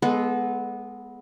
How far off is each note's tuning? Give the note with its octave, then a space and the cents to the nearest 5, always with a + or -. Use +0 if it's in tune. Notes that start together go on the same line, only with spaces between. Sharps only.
G#3 +0 B3 -5 A4 -30